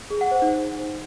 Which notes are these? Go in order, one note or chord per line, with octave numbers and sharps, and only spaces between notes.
G#4
F#5
C5
D#4